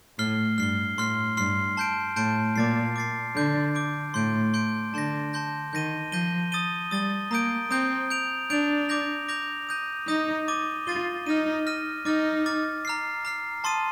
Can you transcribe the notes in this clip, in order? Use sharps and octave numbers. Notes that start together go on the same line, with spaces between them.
A2 F6 C7 G7
G2 F6 C7 G7
A2 C6 F6 C7
G2 C6 F6 C7
A5 C6 G6 D7
A2 A5 C6 G6 D7
A#2 D6 A6 C7
D6 A6 C7
D3 D6 G6 D7
D6 G6 D7
A2 C6 G6 D7
C6 G6 D7
D3 A5 C6 G6 A#6
A5 C6 G6 A#6
D#3 G6 A#6 D#7 G7
F3 G6 A#6 D#7 G7
D#6 A6 D#7 G7
G3 D#6 A6 D#7 G7
A#3 A#5 D#6 G6 D7
C4 A#5 D#6 G6 D7
G6 D7 F7
D4 G6 D7 F7
D6 G6 A#6 F7
D6 G6 A#6 F7
D#6 G6 A#6 D#7
D#4 D#6 G6 A#6 D#7
D6 A6 D#7 G7
F4 D6 A6 D#7 G7
D#4 F6 A#6 D#7
F6 A#6 D#7
D#4 D6 F6 A6
D6 F6 A6
A#5 F6 C7
A#5 F6 C7
A5 C6 D#6 A6 D#7